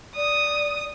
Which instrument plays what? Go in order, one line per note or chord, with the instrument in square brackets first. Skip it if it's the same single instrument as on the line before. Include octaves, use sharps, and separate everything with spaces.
[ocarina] D5 [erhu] D#6